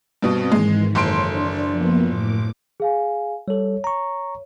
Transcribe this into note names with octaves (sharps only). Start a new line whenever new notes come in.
G2 B2 C4
G#2 D#3 E3 G#3
F#1 A4 C5 C#5 C6 D7
D4 D5
F3 A#3 B3
A2 D6
G#4 F5 G#5
G3 A4 C#5
A#5 C#6